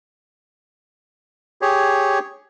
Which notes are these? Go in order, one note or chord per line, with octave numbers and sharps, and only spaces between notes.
G4 G#4 C#5